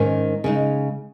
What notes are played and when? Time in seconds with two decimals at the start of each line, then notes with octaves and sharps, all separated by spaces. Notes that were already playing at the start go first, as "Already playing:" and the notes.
Already playing: G#2 D#3 A#3 C#4
0.44 C#3 G#3 D#4